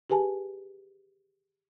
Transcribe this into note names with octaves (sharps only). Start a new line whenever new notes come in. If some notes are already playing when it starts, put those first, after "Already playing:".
G4 G#4 B4 G#5 A5